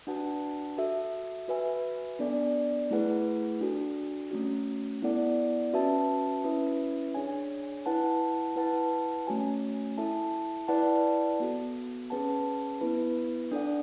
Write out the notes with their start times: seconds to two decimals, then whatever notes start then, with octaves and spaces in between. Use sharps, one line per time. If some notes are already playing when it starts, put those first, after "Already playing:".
0.07 D4 F#4 B4 F#5 A5
0.78 F#4 A4 E5
1.48 F#4 B4 E5 G#5
2.19 B3 D4 A4 D5
2.91 A3 E4 G#4 B4 F#5
3.60 D4 F#4 A4
4.31 A3 C#4 F#4
5.02 B3 E4 A4 D5 F#5
5.73 C#4 F#4 B4 E5 A5
6.44 C#4 E4 B4 E5
7.14 D4 G#4 C#5 G#5
7.86 E4 B4 F#5 A5
8.56 E4 B4 F#5 A5
9.27 A3 C#4 F#4 C#5 G#5
9.98 E4 A4 E5 A5
10.68 E4 B4 D5 F#5 A5
11.40 B3 F#4 A4
12.10 C#4 G#4 B4 F#5 A5
12.81 B3 E4 B4
13.51 D4 A4 D5 F#5